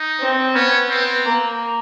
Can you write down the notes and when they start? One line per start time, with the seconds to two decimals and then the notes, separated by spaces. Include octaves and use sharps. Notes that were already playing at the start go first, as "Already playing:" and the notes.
Already playing: D#4
0.20 C4
0.54 B3 C#4
0.90 C4
1.25 A#3